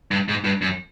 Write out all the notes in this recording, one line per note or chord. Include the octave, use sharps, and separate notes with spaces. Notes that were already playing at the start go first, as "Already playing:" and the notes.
G2
G#2
G2
F#2